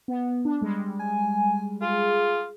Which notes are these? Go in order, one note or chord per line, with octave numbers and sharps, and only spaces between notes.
B3
D4
G3 G#3
G#5
F4 G#4